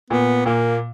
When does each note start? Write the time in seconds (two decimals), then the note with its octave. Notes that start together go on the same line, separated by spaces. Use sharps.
0.10 A#2 B3
0.46 A#2 A#3